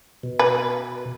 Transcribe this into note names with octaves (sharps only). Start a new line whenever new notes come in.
B2
B4